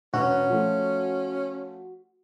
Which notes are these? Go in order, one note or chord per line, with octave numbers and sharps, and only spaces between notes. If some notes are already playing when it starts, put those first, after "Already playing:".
E1 C#4 F#4 B4
F3 A3 F4